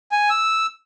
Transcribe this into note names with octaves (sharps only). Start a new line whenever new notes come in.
G#5
E6